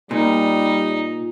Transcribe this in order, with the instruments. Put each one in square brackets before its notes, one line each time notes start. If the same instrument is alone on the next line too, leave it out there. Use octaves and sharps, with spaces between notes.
[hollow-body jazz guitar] A#2 [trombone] G3 [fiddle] D#4